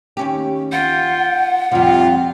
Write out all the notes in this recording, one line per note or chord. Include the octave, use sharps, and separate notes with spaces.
D#2 C#4 G4
F4 F#5 G5
F2 C3 G3 F4